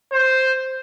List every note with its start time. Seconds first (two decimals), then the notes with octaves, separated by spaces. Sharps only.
0.13 C5